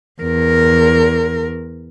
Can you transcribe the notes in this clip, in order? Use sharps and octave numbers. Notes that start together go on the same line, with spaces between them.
E2 A#4